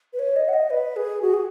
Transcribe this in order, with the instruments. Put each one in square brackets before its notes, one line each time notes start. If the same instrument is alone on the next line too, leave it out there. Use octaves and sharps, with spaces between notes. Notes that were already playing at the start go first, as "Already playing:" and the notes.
[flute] B4
C#5
D#5
F#5
D#5
B4
G#4
F#4
G#4